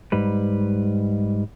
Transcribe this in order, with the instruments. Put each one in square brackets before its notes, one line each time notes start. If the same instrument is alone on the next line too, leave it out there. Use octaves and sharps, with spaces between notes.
[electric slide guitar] G#2 G3 B4